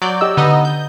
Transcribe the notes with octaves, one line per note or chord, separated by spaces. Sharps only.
F#3 D5 G6
G4 D#5 E6
D3 B3 D#4 D#5
G6